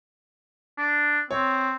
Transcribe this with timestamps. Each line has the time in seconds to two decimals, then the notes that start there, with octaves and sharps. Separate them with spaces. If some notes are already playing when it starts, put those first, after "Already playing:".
0.78 D4
1.31 C4 C#5